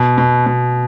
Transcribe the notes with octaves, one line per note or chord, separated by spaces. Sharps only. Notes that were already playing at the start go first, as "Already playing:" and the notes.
Already playing: B2
B2
B2